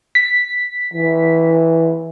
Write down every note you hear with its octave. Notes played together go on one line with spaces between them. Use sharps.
B6
E3